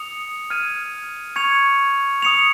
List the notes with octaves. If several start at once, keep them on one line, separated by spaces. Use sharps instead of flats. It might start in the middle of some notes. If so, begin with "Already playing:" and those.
Already playing: D#6 C#7 F7
F6 G#6 D#7
C#6 G#6 C#7 F7
D#6 C#7 F7